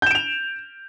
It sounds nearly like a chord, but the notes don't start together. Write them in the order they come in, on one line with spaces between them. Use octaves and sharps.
G6 E7 D7 F7